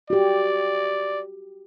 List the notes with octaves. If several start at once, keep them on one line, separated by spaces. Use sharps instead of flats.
F#4 G4 D5